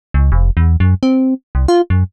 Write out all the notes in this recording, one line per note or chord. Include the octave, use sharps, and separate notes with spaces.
C#2
F1
E2
F#2
C4
C2
F4
F#2